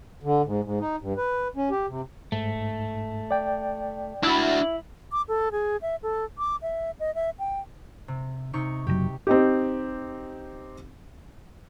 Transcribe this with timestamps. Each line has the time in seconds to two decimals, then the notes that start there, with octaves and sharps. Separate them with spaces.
0.23 D3
0.45 G#2
0.63 G#2
0.80 D#4
1.01 G2
1.17 B4
1.56 C#4
1.70 G4
1.87 C3
2.32 G#2 A3
3.31 D5 G5
4.23 D4 E4 F#4
5.12 D6
5.28 A4
5.52 G#4
5.82 E5
6.03 A4
6.38 D6
6.62 E5
7.00 D#5
7.15 E5
7.39 G5
8.08 C3
8.53 C3 D#4 C#6
8.87 F#1 A2 F#3 G4
9.27 C4 D#4 G4